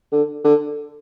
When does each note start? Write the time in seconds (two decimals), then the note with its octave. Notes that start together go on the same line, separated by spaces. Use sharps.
0.12 D3
0.44 D3